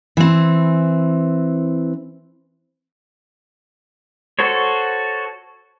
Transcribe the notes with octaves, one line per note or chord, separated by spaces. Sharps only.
E3 C4
F#4 A4 C5 C#5